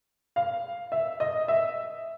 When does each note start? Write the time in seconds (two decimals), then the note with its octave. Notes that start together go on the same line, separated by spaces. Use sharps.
0.36 F5
0.92 E5
1.20 D#5
1.48 E5